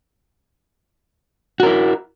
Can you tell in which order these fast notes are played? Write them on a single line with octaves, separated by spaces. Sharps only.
F#4 A#4 E4